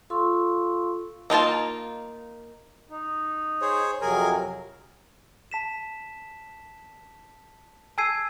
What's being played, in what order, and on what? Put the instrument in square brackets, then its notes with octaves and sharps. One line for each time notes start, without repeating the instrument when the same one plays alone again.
[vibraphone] F4 A4 F5 C6 C#6 E6
[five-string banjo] A#3 D#4 F4 A5
[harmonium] D#4
[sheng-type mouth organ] G#4 C5 C#5
[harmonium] F2 C3 F#3 [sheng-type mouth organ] G#4 A#4 G#5
[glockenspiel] A5 B6 E7
G#5 A5 E6 G#6 C7 D#7